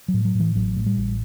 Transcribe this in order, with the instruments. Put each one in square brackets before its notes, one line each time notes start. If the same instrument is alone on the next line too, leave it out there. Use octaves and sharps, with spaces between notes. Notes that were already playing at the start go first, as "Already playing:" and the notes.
[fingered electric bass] F#3
A2
F#3
A2
E3
A1 F#3
A2
G3
A1